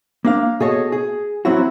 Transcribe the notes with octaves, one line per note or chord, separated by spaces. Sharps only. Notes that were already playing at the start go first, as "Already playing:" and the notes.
A#3 D4 F5
B2 G#4 A4 C#5 D#5
G#4
F#3 C4 C#4 E4 F#4